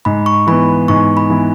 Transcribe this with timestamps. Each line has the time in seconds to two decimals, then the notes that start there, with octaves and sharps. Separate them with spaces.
0.05 G#2 B5
0.26 C#6
0.47 E3 B5
0.51 B3
0.88 G#2 C#6
1.17 B5
1.30 E3 B3